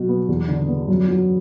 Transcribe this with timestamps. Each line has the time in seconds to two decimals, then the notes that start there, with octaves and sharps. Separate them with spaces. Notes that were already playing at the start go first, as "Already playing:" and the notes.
Already playing: B2 F#3
0.09 B3
0.28 E2
0.48 D3
0.68 B3
0.88 F#2
1.09 F#3